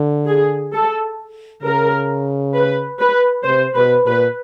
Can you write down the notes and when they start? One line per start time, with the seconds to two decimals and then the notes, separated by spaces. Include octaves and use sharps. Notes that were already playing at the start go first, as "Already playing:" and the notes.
Already playing: D3
0.27 G#4
0.73 A4
1.64 C#3 A#4
2.55 B4
2.99 B4
3.45 C3 C5
3.75 B2 B4
4.06 A#2 B4